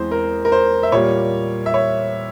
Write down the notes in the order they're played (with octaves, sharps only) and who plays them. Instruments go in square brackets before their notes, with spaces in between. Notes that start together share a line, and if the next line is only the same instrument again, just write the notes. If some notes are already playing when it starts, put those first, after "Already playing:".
Already playing: [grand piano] E2 E3 G#3 C4 C5
A#4
A#4
C5
E5
A#2 G3 A#3 C#5
E5
C#5